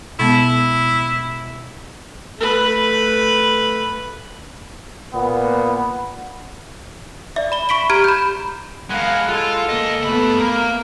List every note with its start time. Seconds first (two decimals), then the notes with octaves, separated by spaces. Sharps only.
0.19 B2 G#3 B3 E4
2.38 A3 B4
5.14 A#2 B3
7.36 D5 E5
7.52 B5 G7
7.69 B5 C#6 B6 D7 G7
7.90 G4 A#5 F6 G#6 D7
8.04 B5 G6
8.90 G#3 A#4 F5 F#5 B5
9.29 G#3 F4 A4
9.70 C#2 A#3 D#5
10.03 G2 A3 B3 B5
10.39 A#3 A#4